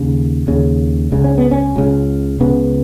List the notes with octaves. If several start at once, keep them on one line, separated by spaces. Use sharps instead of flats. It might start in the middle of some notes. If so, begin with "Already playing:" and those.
Already playing: D#2 C#3
D#2 C#3
C#2 C#3
C#4
B3
C#4
C#2 C#3
C#2 C#3 B3